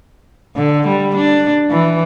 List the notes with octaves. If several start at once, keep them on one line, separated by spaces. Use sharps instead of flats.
D3
G3
D4
E3